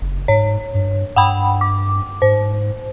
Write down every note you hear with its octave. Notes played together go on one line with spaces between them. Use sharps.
F#1
G#2 C#5
G2
G2 F#5 G5 B5
D6
G#2 C5